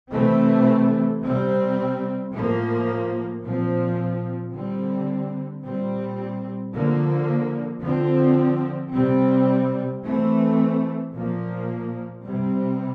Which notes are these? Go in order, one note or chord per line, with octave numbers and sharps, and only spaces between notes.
C3 E3 A3 C4
C3 G3 C4
A2 F3 A#3
A#2 F3 C4
D3 G3 C4
A#2 G3 C4
D3 F3 A#3
D3 F3 C4
C3 G3 C4
E3 A3 C4
A#2 F3 A#3
C3 G3 C4